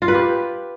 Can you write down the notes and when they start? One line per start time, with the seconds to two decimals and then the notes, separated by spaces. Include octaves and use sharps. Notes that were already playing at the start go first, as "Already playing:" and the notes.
0.02 F4
0.08 B4
0.14 G4